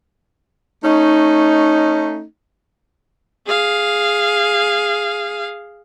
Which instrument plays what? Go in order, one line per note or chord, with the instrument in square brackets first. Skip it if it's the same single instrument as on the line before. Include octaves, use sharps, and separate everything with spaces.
[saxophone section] A3 C#4 D#4
[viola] G#4 F5